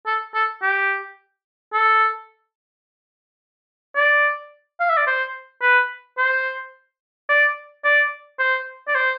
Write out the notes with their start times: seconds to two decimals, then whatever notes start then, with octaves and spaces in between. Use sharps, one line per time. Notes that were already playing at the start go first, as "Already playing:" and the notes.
0.07 A4
0.35 A4
0.62 G4
1.73 A4
3.96 D5
4.80 F5
4.89 E5
4.97 D5
5.07 C5
5.62 B4
6.18 C5
7.29 D5
7.85 D5
8.39 C5
8.88 D5
8.95 C5